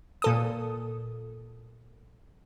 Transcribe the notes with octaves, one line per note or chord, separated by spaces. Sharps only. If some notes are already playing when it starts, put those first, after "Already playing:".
A#2 A4 D#6